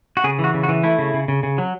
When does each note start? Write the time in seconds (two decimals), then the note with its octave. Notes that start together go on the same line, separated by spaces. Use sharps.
0.17 F#4
0.24 C#3 G#4
0.39 E3
0.44 F#4
0.54 C#3
0.63 F#4
0.69 E3
0.84 A3 E4
0.99 C#3
1.14 C#3
1.28 C#3
1.43 C#3
1.58 F#3